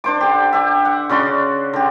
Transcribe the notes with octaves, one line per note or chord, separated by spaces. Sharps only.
D4 C5 D6
D3 G4
G4 E5
F#5
C#3 F#4 D5 C6
D3 G4